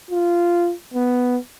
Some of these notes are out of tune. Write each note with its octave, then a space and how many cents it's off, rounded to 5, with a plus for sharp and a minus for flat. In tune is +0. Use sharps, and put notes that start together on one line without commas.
F4 -10
B3 +0